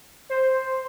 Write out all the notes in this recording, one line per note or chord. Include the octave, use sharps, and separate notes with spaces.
C5